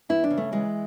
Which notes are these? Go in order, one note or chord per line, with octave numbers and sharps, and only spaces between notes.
E2 E4
D4
C#3
A3
E3 G#3